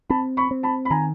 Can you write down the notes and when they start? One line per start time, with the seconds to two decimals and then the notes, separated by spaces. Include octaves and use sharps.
0.10 C4 A5 B5
0.37 B5 C#6
0.51 C4
0.63 A5 B5
0.85 B5
0.91 D#3 G#5 A#5